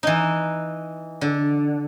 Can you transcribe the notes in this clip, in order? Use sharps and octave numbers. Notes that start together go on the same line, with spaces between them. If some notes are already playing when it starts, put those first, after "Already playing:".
E3 D#4
D3